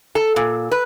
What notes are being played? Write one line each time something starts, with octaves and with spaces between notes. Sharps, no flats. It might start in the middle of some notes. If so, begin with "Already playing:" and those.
A4
A#2
B4